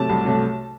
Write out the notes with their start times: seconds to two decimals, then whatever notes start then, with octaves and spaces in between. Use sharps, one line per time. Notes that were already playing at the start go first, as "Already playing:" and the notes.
Already playing: C3 F#3 A3 A5
0.09 C2
0.25 C3 F#3 A3